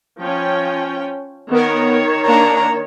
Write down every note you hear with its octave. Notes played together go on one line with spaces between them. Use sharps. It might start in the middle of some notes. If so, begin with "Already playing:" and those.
F3 C#4 G5
D#3 B3 A#4 C#5
A#3 D4 A#5